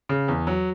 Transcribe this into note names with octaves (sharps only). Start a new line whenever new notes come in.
C#3
E2
F#3